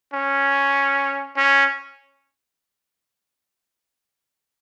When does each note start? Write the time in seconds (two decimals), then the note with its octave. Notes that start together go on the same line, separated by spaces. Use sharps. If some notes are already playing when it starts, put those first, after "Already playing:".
0.14 C#4
1.37 C#4